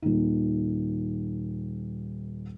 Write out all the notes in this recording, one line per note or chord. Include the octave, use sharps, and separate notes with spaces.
D#1 D#3